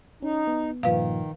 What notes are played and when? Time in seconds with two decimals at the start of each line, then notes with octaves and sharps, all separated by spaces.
0.22 C#4 D#4
0.47 B3
0.83 G2 A#2 D#3 F3 B4 F5